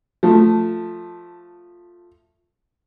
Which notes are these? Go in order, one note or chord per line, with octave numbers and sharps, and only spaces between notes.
F3 A3